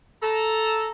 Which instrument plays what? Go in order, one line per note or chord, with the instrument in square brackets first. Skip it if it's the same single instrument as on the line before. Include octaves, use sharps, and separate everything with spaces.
[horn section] A4 A#5